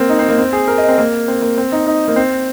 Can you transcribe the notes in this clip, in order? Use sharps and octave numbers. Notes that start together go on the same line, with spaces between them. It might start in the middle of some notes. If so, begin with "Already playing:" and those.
Already playing: A#3 C4
D#4
C4
A#3
C4
G#4
A#4
D#5
C4
A#3
C4
A#3
C4
D#4
D#4
A#3
C4